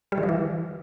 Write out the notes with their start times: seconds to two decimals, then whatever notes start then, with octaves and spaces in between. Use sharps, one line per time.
0.12 G3
0.18 D#3
0.23 F3
0.29 E3